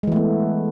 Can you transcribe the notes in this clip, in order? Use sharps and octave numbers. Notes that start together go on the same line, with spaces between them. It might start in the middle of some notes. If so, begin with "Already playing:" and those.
E3 G#3 A3 B3